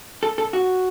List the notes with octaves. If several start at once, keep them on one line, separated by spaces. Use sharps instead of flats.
A4
A4
F#4